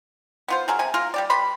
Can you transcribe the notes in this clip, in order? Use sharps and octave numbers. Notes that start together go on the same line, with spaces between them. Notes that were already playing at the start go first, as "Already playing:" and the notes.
B3 F4 C5
F#3 G#4 A#4 F5
C3 G#5
A#3 F4 A#4
G3 G4 D5
G3 B4 B5 C6